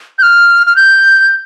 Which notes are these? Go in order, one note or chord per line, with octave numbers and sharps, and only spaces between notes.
G6
F6
F6
G6